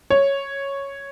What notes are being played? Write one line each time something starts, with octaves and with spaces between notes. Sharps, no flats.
C#5